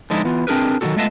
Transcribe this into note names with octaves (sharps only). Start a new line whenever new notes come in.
D3 F3 G#3 D#4 E4 A4
E3 B3 F4
C4 D4 G#4 A#4 B4
D#3 F#3 G3 D4 F#4 A4
G#3 A3 B3 F4 D#5 E5